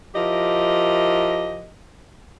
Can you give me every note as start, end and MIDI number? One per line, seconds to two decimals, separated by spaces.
0.15 1.70 53
0.15 1.70 64
0.15 1.70 67
0.15 1.70 70
0.15 1.70 75